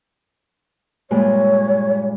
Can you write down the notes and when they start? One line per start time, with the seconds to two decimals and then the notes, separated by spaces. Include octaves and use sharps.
1.11 G2 A#2 G#3 C#5